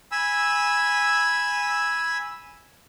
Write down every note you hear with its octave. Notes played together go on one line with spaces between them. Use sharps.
G#5 B5 E6